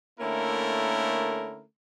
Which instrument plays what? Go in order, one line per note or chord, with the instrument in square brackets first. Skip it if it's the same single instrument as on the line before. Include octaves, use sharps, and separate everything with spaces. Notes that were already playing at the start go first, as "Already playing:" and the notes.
[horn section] D3 A3 A#3 C#4 E4 A#4